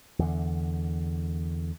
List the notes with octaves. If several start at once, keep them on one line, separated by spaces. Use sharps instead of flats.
E2 D3